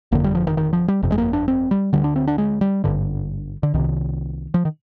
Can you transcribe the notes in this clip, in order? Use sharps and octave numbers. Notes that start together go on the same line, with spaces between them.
G1 F2 D3 A#3
G3
F3
D#3
D#3
F3
G3
G1 F2 C3
G#3
A#3
D4
C4
G3
D2 D3 G3
D4
C4
D4
G#3
G3
G#1 G2 D3
D3
C2 C3 D#3
F3
D#3